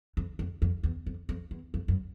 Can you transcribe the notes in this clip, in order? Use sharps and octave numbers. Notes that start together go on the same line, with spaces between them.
F2
F2
F2
E2
F2
F2
E2
F2
F#2